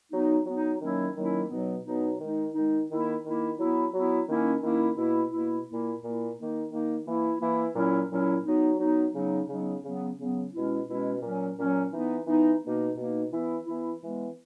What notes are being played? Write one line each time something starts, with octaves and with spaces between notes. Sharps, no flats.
F#3 B3 D#4
F#3 B3 D#4
D#3 F#3 A#3 C#4 E4
D#3 F#3 A#3 C#4 E4
B2 F#3 B3 D#4
B2 F#3 B3 D#4
D#3 G#3 D#4
D#3 G#3 D#4
D#3 A#3 E4
D#3 A#3 E4
F#3 B3 E4
F#3 B3 E4
D#3 A#3 C#4 E4
D#3 A#3 C#4 E4
B2 A#3 E4
B2 A#3 E4
A#2 A#3 E4
A#2 A#3 E4
D#3 A#3 D#4
D#3 A#3 D#4
E3 A#3 E4
E3 A#3 E4
A#2 F#3 C#4 E4
A#2 F#3 C#4 E4
F#3 B3 D#4
F#3 B3 D#4
C#3 F#3 B3 D#4
C#3 F#3 B3 D#4
C#3 F#3 B3
C#3 F#3 B3
B2 G#3 C#4 E4
B2 G#3 C#4 E4
A#2 F#3 C#4
A#2 F#3 C#4
E3 B3 D#4
E3 B3 D#4
B2 A#3 D#4
B2 A#3 D#4
E3 B3 E4
E3 B3 E4
E3 G#3 B3